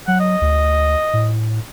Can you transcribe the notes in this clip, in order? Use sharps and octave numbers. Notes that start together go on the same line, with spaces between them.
F#3 F#5
D#5
D2
A2